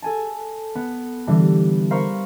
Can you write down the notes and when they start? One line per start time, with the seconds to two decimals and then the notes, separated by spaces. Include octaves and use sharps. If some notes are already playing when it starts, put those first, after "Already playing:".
0.02 A4 G#5 A5
0.75 B3
1.27 D3 E3 G3
1.90 A#4 C5 F5 A#5 B5 C#6